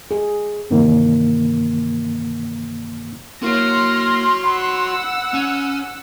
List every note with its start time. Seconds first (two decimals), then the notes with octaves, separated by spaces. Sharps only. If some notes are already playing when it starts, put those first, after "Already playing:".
0.11 G#4
0.70 G2 C3 D#3 E3 A#3
3.43 A#3 E4 F#4 C#5 C6 F6 A#6
4.45 F#5 B5 E6
5.34 C#4